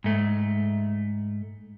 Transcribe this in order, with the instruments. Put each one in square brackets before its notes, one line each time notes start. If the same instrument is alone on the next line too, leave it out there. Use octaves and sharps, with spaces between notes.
[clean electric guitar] G#2 A3